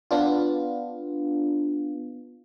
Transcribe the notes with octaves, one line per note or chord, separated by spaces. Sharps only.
B3 D4 F4